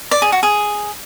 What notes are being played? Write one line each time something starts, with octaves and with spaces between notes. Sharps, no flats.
D5
G#4
F#4
G#4